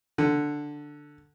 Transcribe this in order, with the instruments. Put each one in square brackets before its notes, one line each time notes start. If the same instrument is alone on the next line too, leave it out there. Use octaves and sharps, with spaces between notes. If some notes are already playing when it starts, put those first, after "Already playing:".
[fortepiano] D3